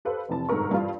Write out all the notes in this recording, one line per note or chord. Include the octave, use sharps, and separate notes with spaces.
G4 A4 B4 C5 F5
F1 C3 E3 A5
G1 G#2 B2 A4 A#4 C#6
G2 E3 G3 F4 F5